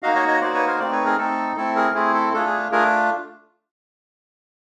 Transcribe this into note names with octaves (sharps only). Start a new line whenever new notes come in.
A#3 D#4 F#4 D#5 F5
C#5 D#5
C#5 D#5
A#3 D#4 F#4 C5 D5
B4 C#5
A#4 C5
A3 C4 D#4 C5 D5
B4 C#5
G#4 A#4
A3 C4 D#4 A4
A3 C4 E4 A4
G#4 A#4
A3 C4 E4 G#4
A4
A3 D4 F4 G#4 A4
G#4
A3 D4 F4 G#4 A#4